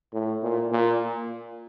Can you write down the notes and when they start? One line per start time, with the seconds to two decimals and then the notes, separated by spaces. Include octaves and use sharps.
0.14 A2
0.43 A#2
0.72 A#2